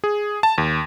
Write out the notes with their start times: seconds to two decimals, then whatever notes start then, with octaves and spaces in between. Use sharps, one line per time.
0.04 G#4
0.43 A5
0.58 D#2